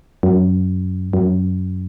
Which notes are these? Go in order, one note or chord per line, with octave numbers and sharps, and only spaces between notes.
F#2
F#2